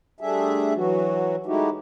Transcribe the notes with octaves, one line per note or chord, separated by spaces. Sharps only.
G3 A3 D4 G#4 E5
E3 F#3 F#4
G#3 A3 D#4 E4 F#4 G4